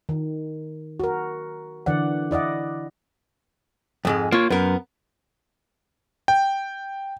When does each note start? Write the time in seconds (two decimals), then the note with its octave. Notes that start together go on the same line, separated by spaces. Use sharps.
0.09 D#3
1.00 F#4 A#4
1.86 D3 E3 D5 F#5
2.31 E4 D5 D#5 F#5
4.05 F2 G#2 G#3
4.32 A#3 F4 C#5
4.50 F#2 B3 A#4
6.28 G5